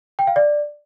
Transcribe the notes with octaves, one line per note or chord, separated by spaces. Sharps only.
G5
F5
D5